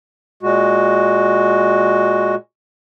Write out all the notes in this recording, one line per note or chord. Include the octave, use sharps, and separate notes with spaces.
A#2 G#3 F#4